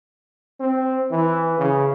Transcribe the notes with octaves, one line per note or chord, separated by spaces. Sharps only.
C4
E3
C#3